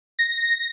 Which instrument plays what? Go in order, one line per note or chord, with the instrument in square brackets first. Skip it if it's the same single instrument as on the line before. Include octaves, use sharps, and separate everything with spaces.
[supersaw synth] A#6